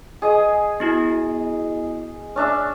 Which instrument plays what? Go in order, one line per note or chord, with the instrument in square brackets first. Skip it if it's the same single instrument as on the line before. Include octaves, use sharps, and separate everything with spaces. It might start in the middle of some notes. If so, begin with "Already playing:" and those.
[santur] G#4 D#5
[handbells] B3 E4 F#4
[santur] C#4 D4 E5